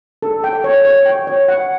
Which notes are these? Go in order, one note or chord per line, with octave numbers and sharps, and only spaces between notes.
A4
G5
C#5
C#5
G5
C#5
F#5